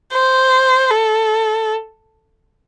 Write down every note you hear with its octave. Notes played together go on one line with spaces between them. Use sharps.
C5
A4